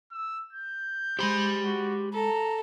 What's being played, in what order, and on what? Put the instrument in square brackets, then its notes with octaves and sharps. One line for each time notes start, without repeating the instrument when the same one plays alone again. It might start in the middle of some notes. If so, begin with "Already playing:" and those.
[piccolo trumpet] E6
G6
[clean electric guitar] G#3 C5 [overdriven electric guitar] G4 B5
[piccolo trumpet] F#4
[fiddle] A4 [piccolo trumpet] A#5